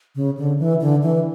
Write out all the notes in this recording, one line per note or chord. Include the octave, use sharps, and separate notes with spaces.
C#3
D3
E3
D3
E3